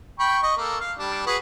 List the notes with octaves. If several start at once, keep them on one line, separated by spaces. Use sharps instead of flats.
G5 B5 C#6
D#5 C#6
A#3 A4
F5
G3 D4
F#4 G#4 B4